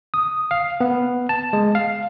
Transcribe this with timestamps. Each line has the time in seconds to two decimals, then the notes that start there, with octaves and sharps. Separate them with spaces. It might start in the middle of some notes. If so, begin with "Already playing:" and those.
0.14 D#6
0.51 F5
0.81 B3
1.29 A5
1.53 G#3
1.75 F5